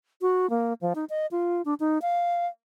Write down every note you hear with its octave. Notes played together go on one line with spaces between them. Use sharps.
F#4
A#3
F3
D#4
D#5
F4
D4
D#4
F5